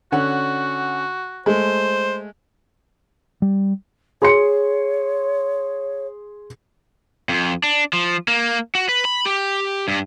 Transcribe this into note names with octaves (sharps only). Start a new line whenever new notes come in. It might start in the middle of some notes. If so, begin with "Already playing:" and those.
D3 C#4 F#4 F#5
G#3 A3 C5
G3
G#4 C#5 C6 C#7
F2
D4
F3
A#3
F#4
B4
B5
G4
G2